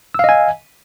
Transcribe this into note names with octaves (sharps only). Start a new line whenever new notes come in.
D#5 F5 G#5 E6